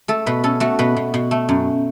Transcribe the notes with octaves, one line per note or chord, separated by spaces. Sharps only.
A3 A4
B2 B4
C#4 A4
A3 F#4
B2 B4
B2
B2
A3
F#2